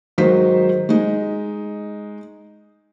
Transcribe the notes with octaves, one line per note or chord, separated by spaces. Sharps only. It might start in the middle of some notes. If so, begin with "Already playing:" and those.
G#2 D#3 F#3 D#4 C5 B6
G#3 D#4